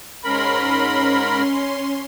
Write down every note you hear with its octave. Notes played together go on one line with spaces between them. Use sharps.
G#2 C#4 A#4 B5 C6